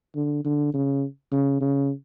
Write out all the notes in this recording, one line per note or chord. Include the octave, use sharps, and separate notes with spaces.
D3
D3
C#3
C#3
C#3